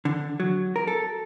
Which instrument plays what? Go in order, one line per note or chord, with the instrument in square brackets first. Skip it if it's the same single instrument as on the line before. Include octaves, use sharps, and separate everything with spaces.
[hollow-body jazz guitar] D3
F#3
A#4
A4